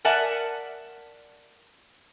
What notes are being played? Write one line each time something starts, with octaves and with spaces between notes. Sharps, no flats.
A#4 D5 E5 F#5 G#5 A5